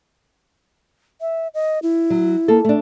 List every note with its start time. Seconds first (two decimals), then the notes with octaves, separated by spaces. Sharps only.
1.21 E5
1.54 D#5
1.83 E4
2.10 F#3
2.48 A#3 A4
2.65 A3 D4